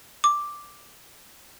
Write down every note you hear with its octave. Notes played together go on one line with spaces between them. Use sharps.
D6